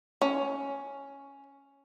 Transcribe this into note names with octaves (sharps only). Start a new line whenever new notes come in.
C#4